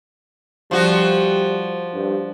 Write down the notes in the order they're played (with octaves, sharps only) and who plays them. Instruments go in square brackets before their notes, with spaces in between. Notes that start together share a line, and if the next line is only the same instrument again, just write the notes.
[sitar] F3 F#4 [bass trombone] G3
[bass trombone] G2